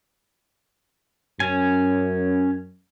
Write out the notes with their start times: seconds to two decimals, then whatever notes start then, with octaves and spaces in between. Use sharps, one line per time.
1.40 F#2 C#4 G#5